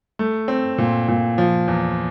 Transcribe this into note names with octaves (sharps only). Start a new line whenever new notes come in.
A3
C4
A#2
A#2
F3
E2